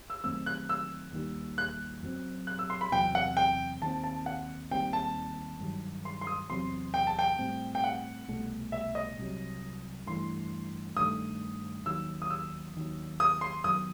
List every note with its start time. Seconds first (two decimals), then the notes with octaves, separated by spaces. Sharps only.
0.10 E6
0.24 F#2 D#3 A3 C4 E6
0.46 F#6
0.69 E6
1.13 D#2 D#3 G3
1.58 F#6
2.03 F#2 F#3 C4
2.47 F#6
2.59 E6
2.70 C6
2.81 B5
2.92 E2 C3 F#3 C4 G5
3.15 F#5
3.37 G5
3.82 D#2 D#3 F#3 C4 A5
4.04 A5
4.26 F#5
4.71 D#2 D#3 G3 C4 G5
4.93 A5
5.60 G2 D#3 F#3
6.05 C6
6.21 C6
6.27 D#6
6.50 E2 C3 F#3 C4 C6
6.94 G5
7.07 A5
7.19 G5
7.39 A2 G3 C4
7.75 G5
7.84 F#5
8.28 C2 B2 A3
8.72 E5
8.95 D#5
9.18 C2 C3 F#3
10.06 G2 E3 A3 C6
10.96 G2 D#3 A3 D#6
11.86 D#2 D#3 F#3 E6
12.22 D#6
12.30 E6
12.75 D#2 D#3 F#3
13.20 D#6
13.41 C6
13.64 F#2 D#3 F#3 B3 D#6